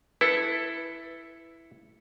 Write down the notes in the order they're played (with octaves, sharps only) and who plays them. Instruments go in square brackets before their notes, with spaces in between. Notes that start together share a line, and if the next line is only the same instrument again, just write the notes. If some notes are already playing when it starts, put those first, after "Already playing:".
[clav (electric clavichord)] E4 A4 [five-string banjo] B4